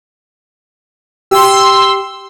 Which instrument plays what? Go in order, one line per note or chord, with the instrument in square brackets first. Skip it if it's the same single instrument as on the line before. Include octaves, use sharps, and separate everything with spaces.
[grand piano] G4 [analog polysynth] C6 E6